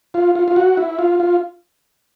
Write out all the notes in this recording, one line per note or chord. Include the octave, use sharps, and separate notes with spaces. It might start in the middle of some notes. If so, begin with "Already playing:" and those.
F4
F4
F4
F#4
E4
F4
F4